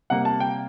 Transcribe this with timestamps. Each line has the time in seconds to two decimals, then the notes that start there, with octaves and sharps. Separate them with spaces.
0.10 C3 G3 A#3 F#5
0.25 A5
0.40 G5